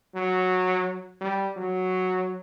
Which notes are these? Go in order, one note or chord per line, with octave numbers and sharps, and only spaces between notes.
F#3
G3
F#3